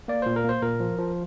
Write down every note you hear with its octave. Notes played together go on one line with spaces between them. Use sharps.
A#3 D5
A#2 C5
A#4
A#3 C5
A#2 A#4
F3
F3